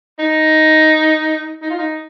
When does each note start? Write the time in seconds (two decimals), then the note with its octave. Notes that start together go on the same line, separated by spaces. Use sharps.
0.19 D#4
1.62 D#4
1.70 F4
1.78 D#4